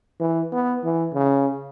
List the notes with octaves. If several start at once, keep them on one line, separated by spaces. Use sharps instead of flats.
E3
B3
E3
C#3